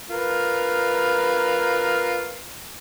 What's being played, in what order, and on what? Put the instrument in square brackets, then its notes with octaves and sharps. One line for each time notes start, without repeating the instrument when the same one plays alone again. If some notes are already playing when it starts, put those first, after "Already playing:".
[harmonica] F4 A#4 B4